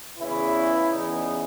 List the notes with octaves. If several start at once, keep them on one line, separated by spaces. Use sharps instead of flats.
E2 C#3 E3 E4
E2 C#3 E3 D#4